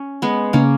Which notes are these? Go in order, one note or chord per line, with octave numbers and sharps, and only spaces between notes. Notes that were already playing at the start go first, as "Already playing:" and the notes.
Already playing: C#4
G#3 B3
C#3 A#3 C#4